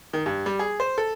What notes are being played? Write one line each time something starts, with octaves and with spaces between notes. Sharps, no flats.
D#3
G2
G3
G#4
C5
A4